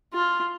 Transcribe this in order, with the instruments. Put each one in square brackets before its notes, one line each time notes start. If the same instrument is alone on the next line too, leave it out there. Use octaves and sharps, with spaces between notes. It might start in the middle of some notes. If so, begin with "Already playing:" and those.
[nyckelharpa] F4